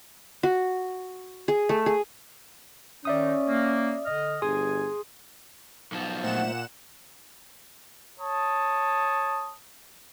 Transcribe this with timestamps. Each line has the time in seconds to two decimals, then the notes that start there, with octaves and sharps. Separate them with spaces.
0.43 F#4
1.48 G#4
1.69 A3
1.86 G#4
3.05 D#3 C#4 D#4 D5 E5 D#6
3.48 A#3
4.06 D3 D#5 F6
4.42 G1 G#4 G#5 C6 D#6
5.92 B1 F3
6.23 A#2 A3 C5 E5 F#5 E7
8.19 C#5 A5 D#6